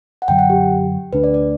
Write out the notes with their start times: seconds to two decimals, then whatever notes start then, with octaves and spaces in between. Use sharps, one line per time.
0.22 F#5
0.28 F#2 D3 F#3 G5
0.39 F#5
0.50 G4
1.13 D2 D3 A3 D4 B4
1.24 D5
1.34 D5